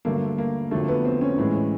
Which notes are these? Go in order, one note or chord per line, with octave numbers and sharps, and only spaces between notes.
G2 D3 F#3 A3 A#3
A#3
F2 D3 F#3 A3 A#3
B3
C4
C#4
A2 E3 G#3